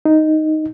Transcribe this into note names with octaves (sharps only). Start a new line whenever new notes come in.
D#4